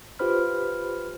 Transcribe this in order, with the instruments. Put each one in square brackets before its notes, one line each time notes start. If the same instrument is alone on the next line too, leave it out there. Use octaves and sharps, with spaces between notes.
[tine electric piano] F4 G4 B4 C5 B5 F6